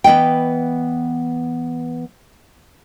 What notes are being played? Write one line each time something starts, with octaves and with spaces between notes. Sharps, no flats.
E3 B3 D#5 G5